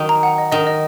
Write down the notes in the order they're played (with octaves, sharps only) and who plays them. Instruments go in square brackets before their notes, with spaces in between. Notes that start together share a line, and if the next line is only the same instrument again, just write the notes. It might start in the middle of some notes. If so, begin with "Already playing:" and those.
Already playing: [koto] D#3 F#3
[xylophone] A#5
F#5
D#5
[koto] D#3 [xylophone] D#5
[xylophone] D#5